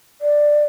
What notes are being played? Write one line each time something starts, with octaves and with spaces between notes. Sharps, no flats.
D5